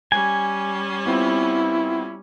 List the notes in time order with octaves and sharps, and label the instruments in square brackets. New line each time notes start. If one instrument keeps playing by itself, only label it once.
[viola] G3 C#4 [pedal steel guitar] G#5
[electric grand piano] B3 C4 F4 [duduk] E4